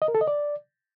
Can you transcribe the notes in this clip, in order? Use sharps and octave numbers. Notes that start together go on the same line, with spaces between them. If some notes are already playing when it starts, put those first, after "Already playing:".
D#5
A#4
A4
D#5
D5